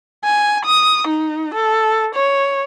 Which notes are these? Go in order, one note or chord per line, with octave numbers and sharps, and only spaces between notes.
G#5
D#6
D#4
A4
C#5